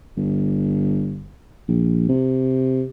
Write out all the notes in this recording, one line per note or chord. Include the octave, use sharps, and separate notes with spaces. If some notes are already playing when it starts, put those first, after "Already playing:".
G1
A#1
C3